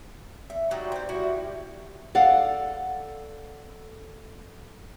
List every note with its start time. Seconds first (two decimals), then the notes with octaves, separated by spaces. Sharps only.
0.50 E5
0.71 F#3 G3 D#4 F#4
0.92 C4 C5
1.09 G3 E4 F#4
2.15 A4 D5 F5 F#5